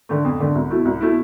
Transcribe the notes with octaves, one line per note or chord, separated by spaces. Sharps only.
D3 A3
F2
D3 A3
C2
B2 A3 E4
C2
B2 A3 E4